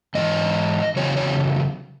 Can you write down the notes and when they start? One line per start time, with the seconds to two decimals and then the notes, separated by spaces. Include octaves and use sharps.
0.15 G#2 E3 D#5
0.96 E2 C#3 F#3 C#5
1.17 C#5